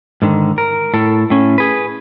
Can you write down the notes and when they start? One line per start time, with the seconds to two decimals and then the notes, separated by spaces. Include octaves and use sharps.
0.22 G#2 D3 D#3
0.58 A#4
0.94 A2 A4
1.30 A2 C#4
1.58 G#4 B4